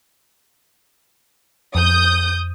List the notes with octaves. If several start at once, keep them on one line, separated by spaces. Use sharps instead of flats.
F2 D#6 G6